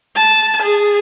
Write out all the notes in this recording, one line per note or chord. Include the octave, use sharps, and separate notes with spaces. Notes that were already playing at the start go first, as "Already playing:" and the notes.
A5
G#4